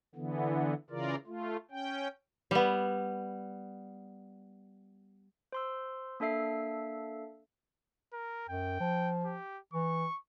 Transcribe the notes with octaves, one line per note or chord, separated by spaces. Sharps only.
D3 E3 B3
C#3 E3 F4 A#4 D5
A3 F4
C#4 G5
G3 B3
C5 C6 E6
A#3 D4 A4 E5 C7
A#4
F#2 G5
F3
G4
E3 C#6